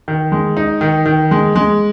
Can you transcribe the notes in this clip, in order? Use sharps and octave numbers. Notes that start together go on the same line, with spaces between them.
D#3
G#3
D#4
D#3
D#3
G#3
G#3